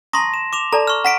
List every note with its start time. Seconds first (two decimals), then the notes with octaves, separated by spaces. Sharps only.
0.13 A5 A#5 C6 C#6 D#6 A#6
0.34 E7
0.53 D6 E7 F7
0.73 A4 D5 A5 A#5
0.87 C#6 F6
1.05 F#5 A#5 B6 D7